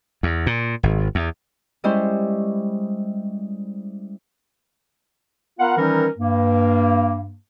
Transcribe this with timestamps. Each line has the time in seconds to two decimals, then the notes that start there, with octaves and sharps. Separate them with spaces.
0.23 E2
0.47 A#2
0.83 G#1
1.15 E2
1.84 G3 G#3 C#4 E4 C5
5.59 B3 F4 A#4 F5 F#5
5.77 D#3 E3 G3 C#4 D#4 A#4
6.17 G2 A#3